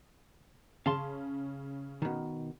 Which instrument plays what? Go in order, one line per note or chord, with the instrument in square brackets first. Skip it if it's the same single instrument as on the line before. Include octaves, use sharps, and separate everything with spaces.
[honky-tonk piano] C#3 C#4 [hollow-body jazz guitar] F5 A5 C6
[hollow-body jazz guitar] B2 D#3